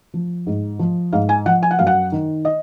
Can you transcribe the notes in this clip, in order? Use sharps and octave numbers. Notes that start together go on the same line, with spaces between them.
F3
G#2
F3
G#2 F5
G#5
F3 F#5
G#5
F#5
F#2 F5
F#5
D#3
D#5